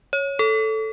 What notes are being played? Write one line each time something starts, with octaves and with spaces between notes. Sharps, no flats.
C#5
A4